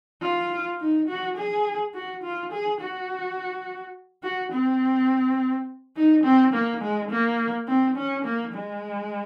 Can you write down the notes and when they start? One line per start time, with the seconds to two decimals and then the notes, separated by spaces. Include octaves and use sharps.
0.22 F4
0.80 D#4
1.08 F#4
1.37 G#4
1.94 F#4
2.23 F4
2.52 G#4
2.80 F#4
4.23 F#4
4.53 C4
5.96 D#4
6.24 C4
6.53 A#3
6.82 G#3
7.10 A#3
7.67 C4
7.96 C#4
8.25 A#3
8.54 G#3